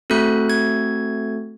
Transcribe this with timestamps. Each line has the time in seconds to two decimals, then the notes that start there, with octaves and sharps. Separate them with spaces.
0.10 A3 C4 F#4 A4 F#6
0.49 G#6